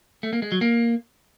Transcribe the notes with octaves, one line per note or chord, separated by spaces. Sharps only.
A3
A#3
G#3
F#3
A#3